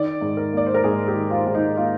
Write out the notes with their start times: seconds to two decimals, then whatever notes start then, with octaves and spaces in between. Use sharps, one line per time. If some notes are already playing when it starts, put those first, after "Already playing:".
Already playing: D#3 D5
0.21 G#2
0.37 A#4
0.53 A#3 D5
0.66 C5
0.74 A#4
0.84 G#2 G#4
1.08 G4
1.16 D#3
1.31 F4
1.47 G#2
1.55 D#4
1.77 A#3 F4